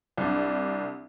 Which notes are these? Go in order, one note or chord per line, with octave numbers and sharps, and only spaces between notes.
C2 D4